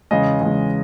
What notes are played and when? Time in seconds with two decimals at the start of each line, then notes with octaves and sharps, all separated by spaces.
0.11 E2 C#3 G#3 D#5
0.41 E2 C#3 G#3